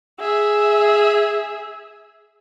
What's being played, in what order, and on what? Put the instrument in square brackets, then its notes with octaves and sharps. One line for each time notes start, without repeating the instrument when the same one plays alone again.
[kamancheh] G#4 E5